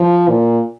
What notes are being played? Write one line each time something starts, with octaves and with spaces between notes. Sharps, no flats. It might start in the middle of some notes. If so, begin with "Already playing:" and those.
Already playing: F3
A#2